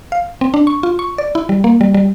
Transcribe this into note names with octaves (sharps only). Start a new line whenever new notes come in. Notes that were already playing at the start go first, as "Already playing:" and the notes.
F5
C4
D4
C#6
F4
C#6
D5
E4
G3
A#3
G3
G3